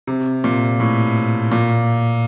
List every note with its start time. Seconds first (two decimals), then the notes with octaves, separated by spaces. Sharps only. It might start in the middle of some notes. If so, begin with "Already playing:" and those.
0.07 C3
0.44 A#2
0.80 A2
1.51 A#2